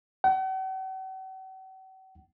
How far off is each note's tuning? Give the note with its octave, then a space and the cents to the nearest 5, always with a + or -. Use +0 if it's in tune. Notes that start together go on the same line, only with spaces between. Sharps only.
F#5 +45